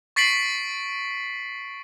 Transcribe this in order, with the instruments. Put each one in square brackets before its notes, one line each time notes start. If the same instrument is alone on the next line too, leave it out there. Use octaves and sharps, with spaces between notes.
[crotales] C#6 A6 B6 C7 D7 F#7